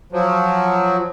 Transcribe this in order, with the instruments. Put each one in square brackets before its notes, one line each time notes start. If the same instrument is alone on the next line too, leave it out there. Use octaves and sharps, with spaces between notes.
[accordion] F3 F#3